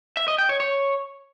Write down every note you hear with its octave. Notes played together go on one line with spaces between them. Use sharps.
E5
D#5
G5
C#5
C#5